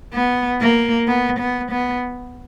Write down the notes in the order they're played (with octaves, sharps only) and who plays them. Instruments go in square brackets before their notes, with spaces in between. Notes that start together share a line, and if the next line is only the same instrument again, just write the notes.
[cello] B3
A#3
B3
B3
B3